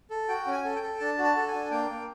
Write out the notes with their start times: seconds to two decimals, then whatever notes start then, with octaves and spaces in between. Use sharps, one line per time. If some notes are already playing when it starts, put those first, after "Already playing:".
0.10 A4
0.28 F#4 G5
0.47 C#4
0.52 G#5
0.65 A4
0.76 G5
0.83 A4
1.00 D4 A5
1.18 F#4
1.24 A5
1.36 A4
1.48 G#5
1.54 D4
1.71 A#3 G5
1.89 A#3